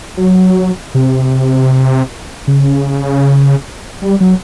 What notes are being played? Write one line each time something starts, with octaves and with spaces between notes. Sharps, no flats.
F#3
C3
C#3
G3
F#3